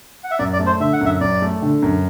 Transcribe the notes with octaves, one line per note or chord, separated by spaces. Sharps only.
F#5
E5
F#2 D5
D5
A3
C5
D3 E5
F#5
F#2 E5
F#2 D5
A3
D3
F#2